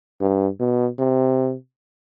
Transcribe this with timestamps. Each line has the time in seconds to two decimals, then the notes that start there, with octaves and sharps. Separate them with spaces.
0.21 G2
0.60 B2
0.98 C3